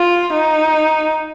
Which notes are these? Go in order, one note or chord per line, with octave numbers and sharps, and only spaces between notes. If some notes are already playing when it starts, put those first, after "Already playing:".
Already playing: F4
D#4